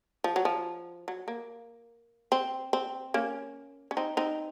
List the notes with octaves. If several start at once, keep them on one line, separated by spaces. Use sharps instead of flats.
F3
F#3
F3
F#3
A#3
C4
C4
A#3 C#4
C#4
C4 D#4
C4 D#4